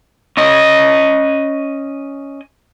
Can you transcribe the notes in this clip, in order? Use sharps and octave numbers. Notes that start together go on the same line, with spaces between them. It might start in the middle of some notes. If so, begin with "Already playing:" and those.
C#4 D#5